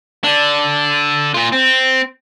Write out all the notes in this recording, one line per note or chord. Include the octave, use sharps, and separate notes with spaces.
D3 D4
A#2 F4
C4